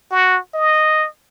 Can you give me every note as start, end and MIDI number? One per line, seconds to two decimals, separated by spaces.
0.11 0.38 66
0.54 1.07 75